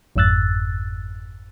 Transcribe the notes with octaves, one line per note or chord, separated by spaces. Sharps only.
G1 F2 G#2 E6 F#6 A6